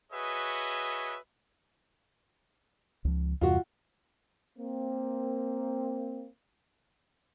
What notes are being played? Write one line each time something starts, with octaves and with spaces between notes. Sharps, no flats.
F#4 G#4 B4 C#5 D#5 E5
C#2 F3
E2 G2 C3 F4 F#4
A#3 C4